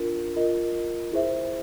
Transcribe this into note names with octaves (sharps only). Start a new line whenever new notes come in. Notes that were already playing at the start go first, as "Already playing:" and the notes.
Already playing: D4 F4 A#4
F4 A#4 D#5
E4 G#4 C5 E5